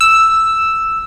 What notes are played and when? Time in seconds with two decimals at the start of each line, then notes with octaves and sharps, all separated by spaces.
0.01 E6